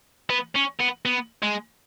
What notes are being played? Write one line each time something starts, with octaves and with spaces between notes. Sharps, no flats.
B3
C#4
B3
B3
G#3